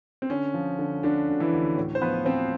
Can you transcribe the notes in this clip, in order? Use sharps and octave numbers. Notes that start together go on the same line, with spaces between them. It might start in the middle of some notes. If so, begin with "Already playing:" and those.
C4
D3 C#4
F3
D3
D2 D3 D4
D2
E3 E4
D2
A2
C5
F3 B3 B4
F3 C4 C5